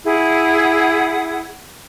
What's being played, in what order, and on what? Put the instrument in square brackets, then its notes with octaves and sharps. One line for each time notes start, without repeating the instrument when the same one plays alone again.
[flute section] E4 G#4 F#5